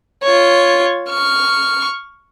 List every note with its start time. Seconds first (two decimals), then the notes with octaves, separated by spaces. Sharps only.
0.24 F4 C#5
1.09 C#6 F6